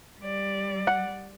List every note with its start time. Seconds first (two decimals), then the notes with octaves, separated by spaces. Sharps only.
0.19 G3 D5
0.87 F#5